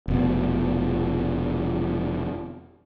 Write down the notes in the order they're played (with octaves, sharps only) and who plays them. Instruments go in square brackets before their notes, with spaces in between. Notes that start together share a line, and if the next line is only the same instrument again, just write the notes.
[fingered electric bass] F1 B2